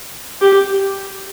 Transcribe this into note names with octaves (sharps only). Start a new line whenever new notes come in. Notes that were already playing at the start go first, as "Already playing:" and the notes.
G4